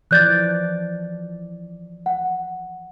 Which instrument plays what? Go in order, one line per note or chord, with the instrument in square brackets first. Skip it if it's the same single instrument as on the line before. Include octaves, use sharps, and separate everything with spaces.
[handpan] E3 F3 D5 [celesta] F#6 G6 A6
[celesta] F#5